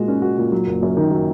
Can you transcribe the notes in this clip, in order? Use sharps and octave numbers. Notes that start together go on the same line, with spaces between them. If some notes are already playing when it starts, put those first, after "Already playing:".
Already playing: A#2 G#3 F#4
C#4
F#4
A#2
F#3
F#1
F#2
D#3
F#3